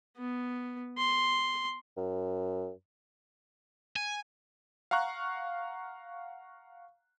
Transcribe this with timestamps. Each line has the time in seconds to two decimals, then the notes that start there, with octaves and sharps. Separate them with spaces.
0.17 B3
0.98 C6
1.97 F#2
3.96 G#5
4.91 F5 F#5 A#5 C#6 F#6